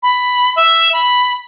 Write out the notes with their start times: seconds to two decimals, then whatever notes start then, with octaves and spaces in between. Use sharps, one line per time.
0.03 B5
0.56 E5
0.93 B5